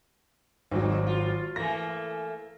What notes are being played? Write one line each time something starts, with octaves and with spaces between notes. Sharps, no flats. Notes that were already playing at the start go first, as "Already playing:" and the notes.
G#1 G2 F#3
F4
E3 A3 A#3 A#6